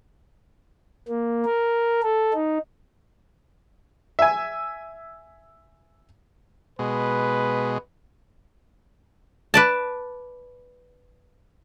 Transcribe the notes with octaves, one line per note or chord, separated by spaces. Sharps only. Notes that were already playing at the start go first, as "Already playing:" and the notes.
A#3
A#4
A4
D#4
E5 G#5
B2 G#3 B4
B4 D5 A5